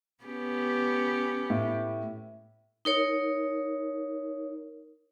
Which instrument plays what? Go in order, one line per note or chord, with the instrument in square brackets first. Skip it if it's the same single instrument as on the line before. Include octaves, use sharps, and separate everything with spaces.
[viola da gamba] B3 C#4 G4
[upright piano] A2
[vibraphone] D#4 A#4 C#5